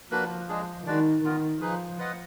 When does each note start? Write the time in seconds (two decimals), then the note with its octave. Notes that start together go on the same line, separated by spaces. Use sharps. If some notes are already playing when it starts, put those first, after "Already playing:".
0.11 F3 A#3 D4 F#4 B4
0.49 G#3 D4 G#4
0.86 D#3 G#3 D4 F#4 D5
1.24 D#3 B3 F4 A#4
1.61 F3 D#4 G#4 B4
1.98 F4 B4 D#5 F#5